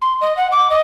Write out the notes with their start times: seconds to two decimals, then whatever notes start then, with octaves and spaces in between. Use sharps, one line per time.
0.01 C6
0.21 D#5
0.37 F#5
0.52 D6
0.70 D#5